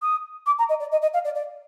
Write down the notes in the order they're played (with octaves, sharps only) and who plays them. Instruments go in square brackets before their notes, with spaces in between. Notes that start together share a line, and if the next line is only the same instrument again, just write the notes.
[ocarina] D#6
D6
A#5
D#5
D5
D#5
D#5
F5
D5
D5